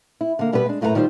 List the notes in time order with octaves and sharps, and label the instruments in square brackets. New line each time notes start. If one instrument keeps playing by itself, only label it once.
[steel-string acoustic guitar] E4
D3 A#3
B2 G3 B3 G4 B4
G#3 D4
F#2 A2 A3 E4 B4 A#5
D#3 G3 F4 C5